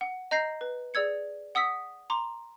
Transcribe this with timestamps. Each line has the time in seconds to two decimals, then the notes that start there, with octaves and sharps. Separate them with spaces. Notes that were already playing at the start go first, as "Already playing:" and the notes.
0.01 F#5
0.31 D#5 A#5 G6 A#6 C7
0.61 B4
0.94 G#4 D5 E6 G#6 C#7
1.55 F#5 D#6 E6 B6
2.10 A#5 C6 D6